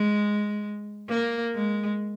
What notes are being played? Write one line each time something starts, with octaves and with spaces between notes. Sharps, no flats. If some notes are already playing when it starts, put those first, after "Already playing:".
Already playing: G#3
A#3
G#3